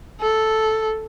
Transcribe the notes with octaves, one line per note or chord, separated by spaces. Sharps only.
A4